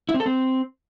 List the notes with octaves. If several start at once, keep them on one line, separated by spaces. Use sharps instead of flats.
E4
C4
A4
C4